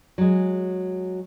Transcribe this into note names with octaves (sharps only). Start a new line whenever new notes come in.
F#3 G#3